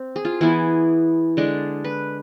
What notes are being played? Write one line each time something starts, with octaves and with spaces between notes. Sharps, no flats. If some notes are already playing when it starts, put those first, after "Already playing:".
Already playing: C4
G#4
F4
E3 B3 E4 G#4
D3 G#3 D4
B4